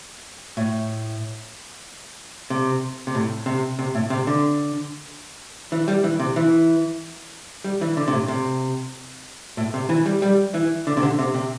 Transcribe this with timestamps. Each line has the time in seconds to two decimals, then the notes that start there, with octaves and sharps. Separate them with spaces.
0.57 A2
2.50 C3
3.07 C3
3.15 A2
3.46 C3
3.79 C3
3.95 A2
4.10 C3
4.27 D3
5.72 E3
5.88 G3
6.04 E3
6.20 C3
6.36 E3
7.64 G3
7.81 E3
7.97 D3
8.08 C3
8.13 A2
8.28 C3
9.57 A2
9.74 C3
9.89 E3
10.06 G3
10.22 G3
10.54 E3
10.87 D3
10.97 C3
11.03 D3
11.19 C3
11.34 C3